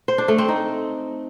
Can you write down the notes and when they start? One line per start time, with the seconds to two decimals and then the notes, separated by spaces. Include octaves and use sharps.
0.08 C5
0.18 D4
0.28 A3
0.38 C4
0.48 D#4